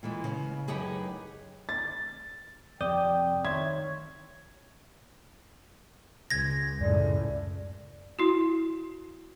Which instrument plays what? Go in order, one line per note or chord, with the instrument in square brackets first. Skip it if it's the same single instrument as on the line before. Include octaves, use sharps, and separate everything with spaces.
[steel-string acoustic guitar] A#2 E3 G#3
C#3
F#2 D#4 G4 G#4 B4
[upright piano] A6
[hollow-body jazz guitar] F2 C3 [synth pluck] D5 D#6 G6 [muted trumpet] G5
[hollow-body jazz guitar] D#3 E5 C6 [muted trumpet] C#5 [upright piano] G#6
[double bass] C#2 [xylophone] G#6 A#6
[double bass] C#2 A2 [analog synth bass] F#2 [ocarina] D5
[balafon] E4 F#4